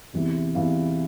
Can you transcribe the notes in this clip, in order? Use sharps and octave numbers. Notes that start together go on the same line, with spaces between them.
E2 C3 E3
E2 C3 E3 F5